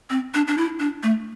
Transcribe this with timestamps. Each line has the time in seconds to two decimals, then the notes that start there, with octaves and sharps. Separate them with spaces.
0.10 C4
0.34 D4
0.48 D4
0.58 E4
0.80 D4
1.03 A3